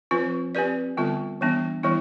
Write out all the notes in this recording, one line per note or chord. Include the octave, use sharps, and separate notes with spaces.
F3 C4 F4 B4
C4 G4 B4 D5
D3 G3 B3 F4
E3 G3 B3 D4
E3 G3 B3 E4